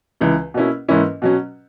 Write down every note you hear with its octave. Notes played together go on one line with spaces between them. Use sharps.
C#2 C#3 E3
B2 A#3 C#4 E4
G#2 E3 A#3 C#4 E4
B2 F#3 C#4